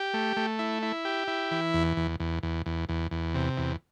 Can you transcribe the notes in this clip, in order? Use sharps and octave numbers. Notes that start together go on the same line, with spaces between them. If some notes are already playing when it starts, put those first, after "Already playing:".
Already playing: G4
A3
A3
E4
E4
G4
E4
E3
E2
E2
E2
E2
E2
E2
E2
C3
E2